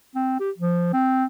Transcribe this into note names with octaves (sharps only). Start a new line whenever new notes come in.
C4
G4
F3
C4